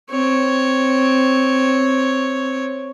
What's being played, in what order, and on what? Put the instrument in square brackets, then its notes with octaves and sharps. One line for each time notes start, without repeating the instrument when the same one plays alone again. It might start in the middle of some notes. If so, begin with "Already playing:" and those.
[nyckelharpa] C4 C#5